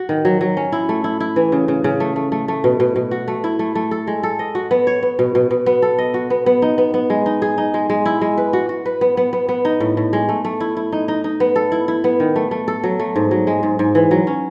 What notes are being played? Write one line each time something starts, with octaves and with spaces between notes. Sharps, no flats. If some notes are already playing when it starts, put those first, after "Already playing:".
Already playing: F#4
D#3
F#3
F#3
C#4
E4
A3
E4
E4
E3
C#3
C#3
C#3
A3
A3
A3
A3
B2
B2
B2
F#4
A3
E4
A3
A3
A4
G#3
A4
D#5
F#4
B3
C#5
B3
B2
B2
B2
B3
A4
D#5
F#4
B3
B3
D#4
B3
B3
G#3
D#4
G#4
D#4
G#3
G#3
E4
G#3
B4
F#4
F#4
B4
B3
B3
B3
B3
D#4
A2
A2
G#3
A3
A3
E4
E4
D#4
D#4
D#4
B3
A4
E4
E4
B3
D#3
A3
A3
A4
F#3
A3
G#2
F#3
G#3
G#2
G#2
E3
F#3
C#4